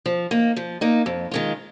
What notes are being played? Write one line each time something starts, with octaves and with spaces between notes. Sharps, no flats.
F3
A#3 D#4
F3
A#3 D#4
F2
D#3 G#3 F4